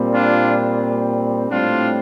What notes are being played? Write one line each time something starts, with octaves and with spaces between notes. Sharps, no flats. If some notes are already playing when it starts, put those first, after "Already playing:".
Already playing: A#2 G3 C4
D4 F4
A2 G3 C4 D4 F4